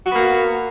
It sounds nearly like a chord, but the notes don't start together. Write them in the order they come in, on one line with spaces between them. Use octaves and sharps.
F#4 B3 A#3